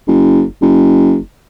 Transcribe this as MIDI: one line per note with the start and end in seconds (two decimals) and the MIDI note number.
0.07 0.43 30
0.61 1.17 30